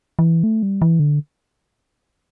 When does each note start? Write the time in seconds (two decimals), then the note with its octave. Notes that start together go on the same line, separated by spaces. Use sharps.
0.19 E3
0.44 A3
0.63 G3
0.82 E3
1.00 D3